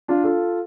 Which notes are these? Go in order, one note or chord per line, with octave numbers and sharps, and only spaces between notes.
D4 F4
F4 A4